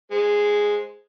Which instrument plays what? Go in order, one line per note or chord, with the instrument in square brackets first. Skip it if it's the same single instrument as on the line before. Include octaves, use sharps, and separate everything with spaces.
[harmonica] G#3 C5